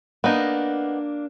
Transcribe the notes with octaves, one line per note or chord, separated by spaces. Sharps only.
A#3 B3 D4 D#4